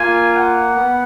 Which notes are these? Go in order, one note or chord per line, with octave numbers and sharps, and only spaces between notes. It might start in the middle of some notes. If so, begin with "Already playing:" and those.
Already playing: A#3 F4 G#5
F#5
B3